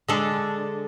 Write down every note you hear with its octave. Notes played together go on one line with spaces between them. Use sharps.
D3 G#3 D4 A4